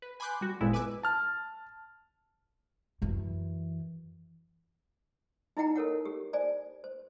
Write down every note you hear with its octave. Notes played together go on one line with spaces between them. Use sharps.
B4
G#5 B5 C6 D6 F#6 G6
G3 F#4
G1 F2 A#2 G#3 B3 E4
B4 G#5 D6 E6 F#6
A5 F6
F#2 E3
D#4 E4 D#5 F#5 G5 A#5
A4 A#4 C#5 F#5
G4
C5 D5 G#5
C5